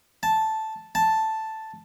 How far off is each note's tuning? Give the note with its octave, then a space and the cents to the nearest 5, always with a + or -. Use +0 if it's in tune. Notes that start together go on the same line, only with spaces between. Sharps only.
A5 -5
A5 +0